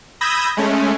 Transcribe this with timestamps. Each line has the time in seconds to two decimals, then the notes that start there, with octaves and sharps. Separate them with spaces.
0.21 B5 D#6 E6 G6 G#6 A#6
0.57 G#3 A3 C#4